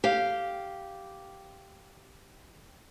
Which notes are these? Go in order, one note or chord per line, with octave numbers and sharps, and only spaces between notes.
G4 F5